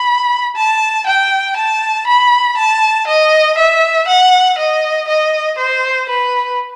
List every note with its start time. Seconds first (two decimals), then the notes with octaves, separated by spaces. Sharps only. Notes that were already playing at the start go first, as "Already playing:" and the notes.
Already playing: B5
0.56 A5
1.06 G5
1.56 A5
2.07 B5
2.57 A5
3.07 D#5
3.58 E5
4.08 F#5
4.58 D#5
5.08 D#5
5.59 C5
6.09 B4